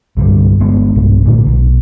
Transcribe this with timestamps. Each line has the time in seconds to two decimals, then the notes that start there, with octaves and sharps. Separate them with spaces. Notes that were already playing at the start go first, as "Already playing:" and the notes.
0.17 C2 G2 D3 G3
0.60 G1 G#3 B3 D4
0.95 B1 G2 C3
1.25 A#2 D3 A3
1.46 B1